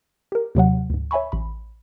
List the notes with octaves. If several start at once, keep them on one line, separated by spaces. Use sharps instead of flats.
G4 A#4
D#2 C3 F#3 F#5
D2 G#2
C#5 E5 G#5 B5 C#6
A1 B5